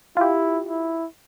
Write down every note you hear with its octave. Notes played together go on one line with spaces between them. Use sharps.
E4 F4 G4
E4